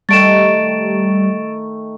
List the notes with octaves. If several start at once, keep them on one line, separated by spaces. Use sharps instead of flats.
D#3 G3 A3 C#6 A6 D7 E7